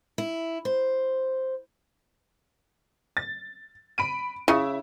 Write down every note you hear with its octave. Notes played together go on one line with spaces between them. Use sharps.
E4
C5
A6
B5 D7 D#7
C#3 E4